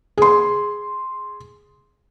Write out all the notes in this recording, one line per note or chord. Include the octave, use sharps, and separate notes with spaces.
G#4 C6